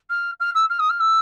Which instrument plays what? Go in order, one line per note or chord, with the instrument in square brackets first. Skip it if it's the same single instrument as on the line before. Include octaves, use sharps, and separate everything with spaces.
[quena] F6
F6
E6
F6
D#6
F6
E6